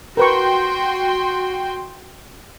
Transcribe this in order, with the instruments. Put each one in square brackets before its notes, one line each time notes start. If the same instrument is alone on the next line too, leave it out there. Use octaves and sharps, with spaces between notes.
[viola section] F#4 G5 C6 [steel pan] A#4 B4 C#6